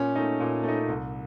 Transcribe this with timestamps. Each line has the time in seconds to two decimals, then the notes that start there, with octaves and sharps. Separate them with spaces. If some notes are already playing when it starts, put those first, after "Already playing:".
Already playing: A#2 C#4
0.15 A3 D#4
0.40 A#2
0.63 A3 D#4
0.88 C2